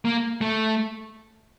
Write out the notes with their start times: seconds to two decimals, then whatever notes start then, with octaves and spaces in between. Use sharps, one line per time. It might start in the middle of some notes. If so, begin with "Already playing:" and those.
0.05 A#3
0.41 A3